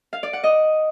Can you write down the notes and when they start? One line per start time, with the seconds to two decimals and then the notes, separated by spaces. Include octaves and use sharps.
0.13 F5
0.23 D5
0.33 F#5
0.43 D#5